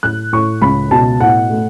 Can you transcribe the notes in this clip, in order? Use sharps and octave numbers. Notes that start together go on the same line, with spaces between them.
A2 F#6
A2 C#6
C#2 B5
B2 A5
A2 F#5
A3